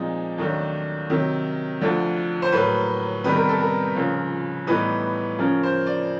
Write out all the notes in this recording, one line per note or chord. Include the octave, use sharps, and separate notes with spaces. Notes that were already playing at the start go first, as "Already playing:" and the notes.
Already playing: A#2 F3 G#3 C4 D#4
D#2 D#3 F#3 A3 D4
C3 D#3 F#3
D2 D3 F3
C5
A2 F#3 A#3 B4
C3 D#3 G3 B3 B4
A#4
A4
A#4
C#2 C#3 F3
A2 E3 G3 B3 D#4 B4
C#3 F3 A#3 C#4 A#4
C5
D5